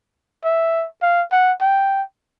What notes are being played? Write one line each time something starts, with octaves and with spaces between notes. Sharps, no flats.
E5
F5
F#5
G5